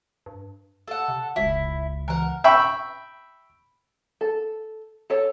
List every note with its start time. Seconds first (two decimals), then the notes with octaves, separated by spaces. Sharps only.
0.26 G2
0.88 A4 F#5
1.08 C3
1.36 E1 C#2 E4
2.08 E3 A#4 F#5
2.44 E5 G5 B5 C#6
4.21 A4
5.10 A4 C#5